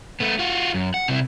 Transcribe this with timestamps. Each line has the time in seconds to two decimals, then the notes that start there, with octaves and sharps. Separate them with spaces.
0.20 A3 B3
0.39 F4 F#4
0.74 F#2
0.94 F#5
1.08 C3 E4